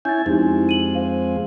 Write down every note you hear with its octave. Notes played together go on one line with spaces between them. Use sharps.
C#4 E4 G#5 G6 A6
F2 G#3 C4 D#4 E4 G4
D#7 F#7
C5 F5